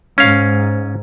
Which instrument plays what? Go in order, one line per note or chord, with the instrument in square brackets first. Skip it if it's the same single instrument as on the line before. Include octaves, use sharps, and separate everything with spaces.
[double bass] G#2 [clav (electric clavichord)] C#4 F5